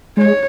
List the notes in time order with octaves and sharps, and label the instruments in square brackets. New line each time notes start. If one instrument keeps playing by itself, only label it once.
[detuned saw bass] G#3 [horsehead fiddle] C#5